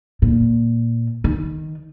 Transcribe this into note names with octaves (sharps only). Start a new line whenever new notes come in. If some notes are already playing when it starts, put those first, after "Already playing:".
A#2
D#3